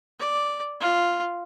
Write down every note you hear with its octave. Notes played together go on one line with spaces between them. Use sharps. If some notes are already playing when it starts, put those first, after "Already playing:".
D5
F4